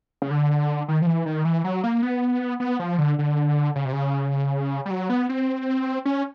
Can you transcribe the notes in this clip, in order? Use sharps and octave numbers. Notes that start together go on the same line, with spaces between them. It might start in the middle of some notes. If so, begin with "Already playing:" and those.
C#3
D3
D#3
F3
E3
D#3
E3
F#3
A#3
B3
B3
F3
D3
D3
C#3
C3
C#3
G3
F#3
B3
C4
C#4